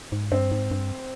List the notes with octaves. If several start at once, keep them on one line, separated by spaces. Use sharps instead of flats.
G#2
G2 C4
G#2
G2